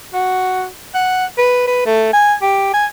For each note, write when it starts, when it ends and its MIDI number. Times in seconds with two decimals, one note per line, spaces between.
0.14 0.66 66
0.94 1.25 78
1.38 1.65 71
1.67 1.86 71
1.86 2.10 57
2.13 2.34 80
2.42 2.73 67
2.74 2.86 80